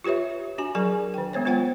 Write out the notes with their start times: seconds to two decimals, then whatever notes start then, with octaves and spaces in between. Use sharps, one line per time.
0.04 F4 G4 B4 C#5 E5
0.58 D4 F#4 G#5
0.75 F#3 G#4 A#4 G#5
1.14 D#3 G5
1.33 G#3 B3 C5 C#5
1.46 B3 F4 C5 F#5 G5